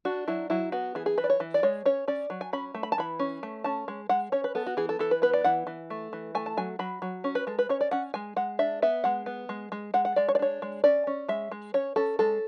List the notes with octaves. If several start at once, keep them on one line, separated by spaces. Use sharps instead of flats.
D4 F#4
F#3 E4
F#3 E4
B3 F#4
E3 G#4
G#4
E3 B4
D5
C#5
E3
D5
G#3 C#5
C#4 C#5
C#4 D5
F#3
G#5
C#4 B5
A3
B5
A5
E3 B5
C#4
A3
C#4 A5
G#3
G#3 F#5
C#4 C#5
B4
B3 A4
F#4
E3 G#4
A4
E3 A4
B4
B3 B4
D5
E3 F#5
E3
A3
E3
A3 G#5
A5
F#3 G#5
F#3 B5
F#3
C#4
B4
G#3 A4
B4
C#4 C#5
D5
C#4 F#5
G#3 G#5
G#3 F#5
D4 E5
B3 E5
G#3 F#5
B3
G#3
G#3
G#3 F#5
F#5
G#3 D5
C#5
D5
D4 C#5
G#3
C#4 D5
C#4
G#3 E5
G#3
C#4 C#5
C#4 A4
G#3 A4